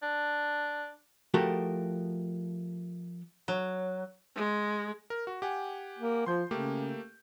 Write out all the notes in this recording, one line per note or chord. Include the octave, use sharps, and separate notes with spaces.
D4
F3 A3 F#4 G4 A#4
F#3
G#3
A#4
F#4
G4 F#5 G#5
A#3
F3 C6 G6
C#3 A3 A#3 G4